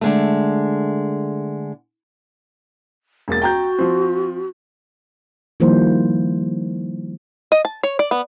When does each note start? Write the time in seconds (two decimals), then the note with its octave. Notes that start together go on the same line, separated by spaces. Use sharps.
0.01 D3 G#3 A3
3.28 E1 A#3 A6
3.42 F#4 G5 A#5 G6
3.79 F3 C4
5.60 D#3 F3 G3 A#3 E4 C5
7.52 D#5
7.65 A5
7.83 C#5
7.99 D5
8.11 B3